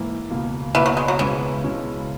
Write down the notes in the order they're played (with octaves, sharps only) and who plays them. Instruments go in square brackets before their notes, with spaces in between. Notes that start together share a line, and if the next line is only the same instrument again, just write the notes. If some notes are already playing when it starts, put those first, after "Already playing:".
Already playing: [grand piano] G#2 E3 A#3 E4
C#2 B2 A#3
[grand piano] C#2 B2 A#3 [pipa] E3
[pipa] F#3
G#3
F#3
[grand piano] C#2 B2 G#3 C#4 E4 [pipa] E3
[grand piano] C#2 B2 G#3 C#4 E4